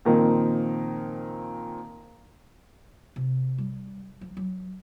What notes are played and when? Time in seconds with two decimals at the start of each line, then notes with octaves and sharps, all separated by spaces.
0.05 A#2 D#3 F3 C4
3.16 C3
3.58 G3
4.21 F3
4.37 F#3